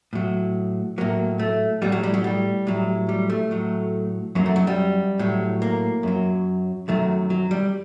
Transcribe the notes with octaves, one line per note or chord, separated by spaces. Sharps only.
A2 F#3
A2 F#3 A#3
A3
A2 F#3 G3
F#3
G3
F#3
G3
A2 F#3
G3
A3
A2 F#3
F#2 F#3 A#3
A3
F#3
G3
A2 F#3
A#3
F#2 F#3
F#2 D#3 F#3 A3
F#3
G3